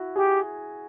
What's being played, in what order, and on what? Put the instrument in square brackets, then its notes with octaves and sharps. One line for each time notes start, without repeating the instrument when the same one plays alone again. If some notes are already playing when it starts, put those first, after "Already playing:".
Already playing: [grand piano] E4 F#4
[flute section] G4 [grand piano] G#4